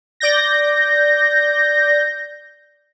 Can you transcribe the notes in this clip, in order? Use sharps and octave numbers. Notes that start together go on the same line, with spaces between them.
D5 G6 A#6